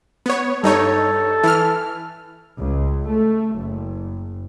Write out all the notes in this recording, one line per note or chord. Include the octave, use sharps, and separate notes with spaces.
B3 C#5
G2 D#4 A4 C#5
E3 F6
C#2
A3
F#1